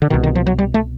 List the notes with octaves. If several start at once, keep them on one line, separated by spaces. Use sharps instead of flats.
D3
C2 B2 D#3
D#3
F3
F#3
G3
A3